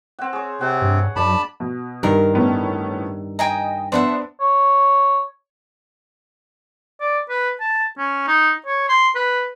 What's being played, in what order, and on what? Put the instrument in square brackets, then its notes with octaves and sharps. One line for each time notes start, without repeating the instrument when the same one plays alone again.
[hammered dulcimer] C4 F#5
G#4 C#5
[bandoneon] C3 C4 [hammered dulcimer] F#5
[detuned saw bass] G2
[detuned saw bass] F#2 [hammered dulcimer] D4 [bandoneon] A5 B5
[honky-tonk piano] B2
[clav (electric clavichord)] G2 D#3 [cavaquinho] A#4 F5
[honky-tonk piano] A2 B3 C#4
[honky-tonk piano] D#5 [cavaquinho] G5 G#5 A#5
[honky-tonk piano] B3 D4 [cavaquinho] C5 E5 F#5
[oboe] C#5
D5
B4
A5
C#4
D#4
C#5
C6
B4